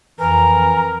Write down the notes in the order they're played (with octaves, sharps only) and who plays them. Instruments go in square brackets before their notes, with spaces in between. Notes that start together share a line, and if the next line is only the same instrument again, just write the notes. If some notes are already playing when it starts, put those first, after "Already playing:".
[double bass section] F2 [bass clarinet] E3 [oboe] A#4 [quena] A#5